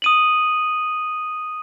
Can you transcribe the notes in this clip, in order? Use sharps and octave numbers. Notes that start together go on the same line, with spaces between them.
D#6 D#7 F#7